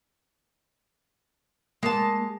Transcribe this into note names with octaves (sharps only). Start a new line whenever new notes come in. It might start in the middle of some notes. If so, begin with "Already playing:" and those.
G#3 A#3 A5